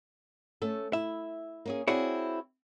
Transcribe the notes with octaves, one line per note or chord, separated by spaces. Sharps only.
A3 C#4 A4
E4 E5
A#3 C#4 G#4
C4 E4 F#4 G#4 C#5 D5